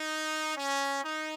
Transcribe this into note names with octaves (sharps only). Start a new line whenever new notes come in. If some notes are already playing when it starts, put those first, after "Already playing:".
Already playing: D#4
C#4
D#4